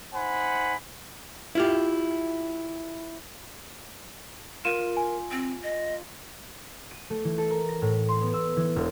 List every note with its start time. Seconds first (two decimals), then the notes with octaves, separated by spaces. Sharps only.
0.14 D#4 C5 F#5 G#5 B5
1.55 E4 F4 G4
4.65 F4 A#4 D#7 E7
4.97 G#5
5.32 C4
5.63 D#5
6.91 D#7
7.10 A3
7.24 E3
7.38 A4
7.51 A#4
7.69 A#6
7.82 A2
8.09 C6
8.21 B3
8.34 E6
8.57 E3
8.76 E1